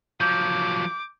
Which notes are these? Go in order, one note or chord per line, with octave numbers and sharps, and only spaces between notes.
F3 F#3 D6 G6